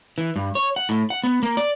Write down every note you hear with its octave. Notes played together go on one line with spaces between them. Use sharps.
E3
G2
C#5
F#5
A2
F#5
B3
A#3
D5